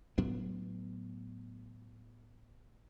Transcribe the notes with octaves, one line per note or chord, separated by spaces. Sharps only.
A2 F#3 B3 D4